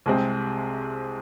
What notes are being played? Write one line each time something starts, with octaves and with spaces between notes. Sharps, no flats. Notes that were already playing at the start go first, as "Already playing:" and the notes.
C2 C3 G#3 C4